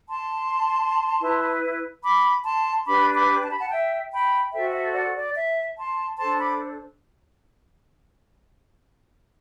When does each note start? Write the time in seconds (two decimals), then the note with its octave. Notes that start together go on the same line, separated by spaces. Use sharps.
0.10 A5 C6
1.22 E4 B4
2.03 B5 D6
2.45 A5 C6
2.86 D4 G4 B4 B5 D6
3.15 B5 D6
3.43 A5
3.51 B5
3.59 F#5 A5
3.71 E5 G5
4.11 G5 B5
4.52 F#4 A4 C5 E5 G5
4.74 E5
4.94 D5 F#5
5.15 D5
5.36 E5
5.78 A5 C6
6.19 D4 A4 C5 A5 C6
6.40 B5 D6